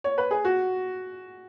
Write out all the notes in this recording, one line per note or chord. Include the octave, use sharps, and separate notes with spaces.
C#5
B4
G#4
F#4